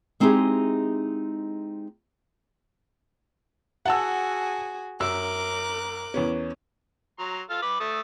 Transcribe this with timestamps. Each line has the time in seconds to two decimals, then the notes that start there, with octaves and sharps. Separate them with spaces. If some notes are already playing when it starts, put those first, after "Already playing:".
0.20 G#3 C4 D#4 E4 G4 G#4
3.86 F#4 G#4 F#5 A5 E6
5.00 F#2 A#4 D6 E6 F#6
6.14 E2 B3 C#4
7.19 F#3 A#5 C6
7.50 F4 A4 F6
7.62 B4 B5 D6
7.80 A3 A4 D#6